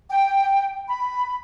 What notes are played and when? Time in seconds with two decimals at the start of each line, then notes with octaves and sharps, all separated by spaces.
0.10 G5
0.88 B5